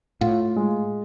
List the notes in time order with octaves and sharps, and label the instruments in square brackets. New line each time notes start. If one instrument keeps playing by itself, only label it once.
[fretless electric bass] A2 [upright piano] F4
[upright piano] G#3